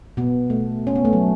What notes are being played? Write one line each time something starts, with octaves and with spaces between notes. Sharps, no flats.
B2 B3
A3
C#4
B3
A3
F#3